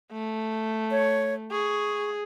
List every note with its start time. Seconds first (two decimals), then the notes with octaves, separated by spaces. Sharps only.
0.12 A3
0.91 C#5
1.51 G#4 C#6